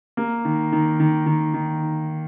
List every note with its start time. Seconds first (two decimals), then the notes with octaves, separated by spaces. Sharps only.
0.17 A#3
0.45 D#3
0.72 D#3
1.00 D#3
1.26 D#3
1.54 D#3